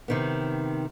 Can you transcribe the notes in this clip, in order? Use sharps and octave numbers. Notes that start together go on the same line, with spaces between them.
C3 D#3 B3